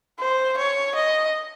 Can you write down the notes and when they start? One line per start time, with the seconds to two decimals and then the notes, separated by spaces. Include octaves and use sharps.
0.20 C5
0.58 C#5
0.95 D#5